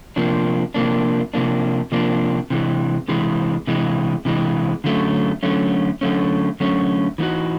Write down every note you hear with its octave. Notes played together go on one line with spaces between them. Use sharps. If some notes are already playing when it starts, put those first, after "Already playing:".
C3 F3 A#3 D4
C3 F3 A#3 D4
C3 F3 A#3 D4
C3 F3 A#3 D4
C3 E3 G#3
C3 E3 G#3
C3 E3 G#3
C3 E3 G#3
D3 F#3 A3 C#4
D3 F#3 A3 C#4
D3 F#3 A3 C#4
D3 F#3 A3 C#4
E3 G#3 B3 D#4 F#4